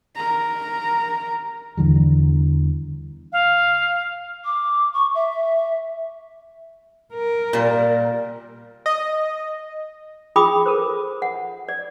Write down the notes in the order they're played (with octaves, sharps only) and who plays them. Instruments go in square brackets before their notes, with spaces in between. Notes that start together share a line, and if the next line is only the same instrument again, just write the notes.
[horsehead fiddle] A#4 A#5
[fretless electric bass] E2 D3 E3 G3
[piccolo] F5
[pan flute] D6
C#6
E5
[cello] A#4
[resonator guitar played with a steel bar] A#2 G3
[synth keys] D#5
[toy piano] F4 G#4 G5 B5 D6 D#6
A4 A#4 C5
F#5
D5